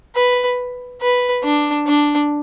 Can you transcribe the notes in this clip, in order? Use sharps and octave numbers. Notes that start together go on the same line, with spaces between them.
B4
B4
D4
D4